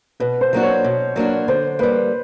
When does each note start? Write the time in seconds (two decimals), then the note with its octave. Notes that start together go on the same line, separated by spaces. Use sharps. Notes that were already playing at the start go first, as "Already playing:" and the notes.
0.20 B2 B4
0.41 C5
0.53 F#3 A#3 D4 F#4
0.63 C#5
0.84 B2
1.16 F#3 A#3 D4 F#4
1.48 D3 C5
1.79 G3 A#3 B4